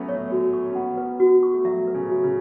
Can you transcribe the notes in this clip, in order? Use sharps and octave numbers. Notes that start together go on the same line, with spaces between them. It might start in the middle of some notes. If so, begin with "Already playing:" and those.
Already playing: F#3 A3 B3 C#4 E5
C#5
B3
F#4
C#6
C#4
B3 F#5
B4
F#4
C#6
A3
F#3 E5
B4
C#3
F#4
C#3